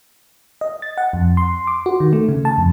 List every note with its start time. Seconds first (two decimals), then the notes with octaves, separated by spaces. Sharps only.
0.61 D#5
0.82 A6
0.98 F#5
1.13 F2
1.37 C6
1.67 D6
1.86 F#4
2.00 D#3
2.13 A3
2.29 C#3
2.45 A5
2.58 F2